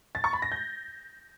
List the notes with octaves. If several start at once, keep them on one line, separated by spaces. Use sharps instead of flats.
A6
C#6
B5
A#6
G6